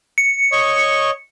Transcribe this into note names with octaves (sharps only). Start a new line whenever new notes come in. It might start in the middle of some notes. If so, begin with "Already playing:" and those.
C#7
C#5 D#5 C#6